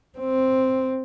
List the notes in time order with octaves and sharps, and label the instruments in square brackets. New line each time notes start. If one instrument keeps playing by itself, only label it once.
[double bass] C4